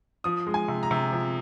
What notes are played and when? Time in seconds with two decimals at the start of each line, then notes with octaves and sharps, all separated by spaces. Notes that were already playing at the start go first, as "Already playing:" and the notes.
0.24 F3 D#6
0.47 G#3
0.54 G#5
0.68 C3
0.83 A#5
0.91 C3
1.12 F3